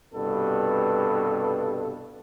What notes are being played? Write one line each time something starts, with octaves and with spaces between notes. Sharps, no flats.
C2 G2 B2 A4